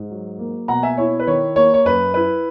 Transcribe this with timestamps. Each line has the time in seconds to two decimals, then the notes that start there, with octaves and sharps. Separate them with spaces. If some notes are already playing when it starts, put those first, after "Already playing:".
Already playing: G#2
0.10 F#3
0.39 A#3
0.68 B2 F#5 A#5
0.83 E5 G#5
0.97 E4 C#5
1.20 B4
1.27 D#3 C#5
1.56 A#3 C#5
1.74 C#5
1.85 F#2 B4
2.14 E4 B4